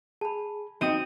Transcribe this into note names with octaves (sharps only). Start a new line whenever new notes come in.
G#4 A5 B5
C4 D#4 F#4 D#5 G5 D#6 D#7